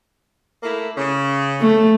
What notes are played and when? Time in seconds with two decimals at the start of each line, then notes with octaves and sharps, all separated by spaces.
0.63 A3 A#3 E4
0.97 C#3
1.60 A3